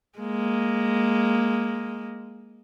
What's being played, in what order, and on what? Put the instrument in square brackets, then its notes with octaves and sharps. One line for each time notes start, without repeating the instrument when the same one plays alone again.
[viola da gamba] G#3 A#3